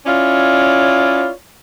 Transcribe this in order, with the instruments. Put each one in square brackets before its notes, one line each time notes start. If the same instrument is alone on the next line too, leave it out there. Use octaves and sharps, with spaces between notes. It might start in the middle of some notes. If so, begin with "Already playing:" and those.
[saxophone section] C#4 E4 F4 C#5 D5